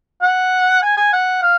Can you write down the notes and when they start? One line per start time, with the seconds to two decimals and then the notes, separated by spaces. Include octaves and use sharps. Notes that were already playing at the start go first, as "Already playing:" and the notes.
0.22 F#5
0.82 G#5
0.97 G#5
1.13 F#5
1.42 F5